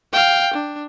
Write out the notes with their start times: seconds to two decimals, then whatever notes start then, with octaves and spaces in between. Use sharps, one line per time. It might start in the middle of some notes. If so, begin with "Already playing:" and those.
0.13 F5 G5
0.54 D4